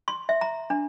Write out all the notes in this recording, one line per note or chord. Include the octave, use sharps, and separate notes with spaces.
C6
E5
A#5
D4